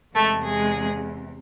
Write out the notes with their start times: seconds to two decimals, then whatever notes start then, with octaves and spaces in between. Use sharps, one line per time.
0.15 E2 C3 G#3 A3 A4
0.43 G#3 G#4